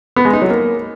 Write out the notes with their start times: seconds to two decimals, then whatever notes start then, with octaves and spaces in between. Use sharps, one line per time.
0.16 B3
0.25 G#3
0.33 D#4
0.42 F#3
0.50 A#3